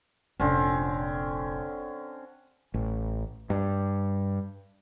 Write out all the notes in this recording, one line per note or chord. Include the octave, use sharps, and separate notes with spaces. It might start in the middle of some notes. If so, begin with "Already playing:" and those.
F1 A#1 D3 C4 C#4
A1
G2